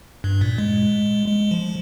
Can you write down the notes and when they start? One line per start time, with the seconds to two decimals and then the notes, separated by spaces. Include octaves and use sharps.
0.24 G2
0.41 A#2
0.58 G#3
1.28 G#3
1.51 F3